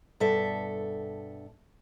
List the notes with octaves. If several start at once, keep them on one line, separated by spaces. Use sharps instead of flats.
G2 B2 A4 E5